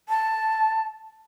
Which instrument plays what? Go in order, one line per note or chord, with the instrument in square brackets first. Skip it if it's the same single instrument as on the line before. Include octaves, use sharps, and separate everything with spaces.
[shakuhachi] A5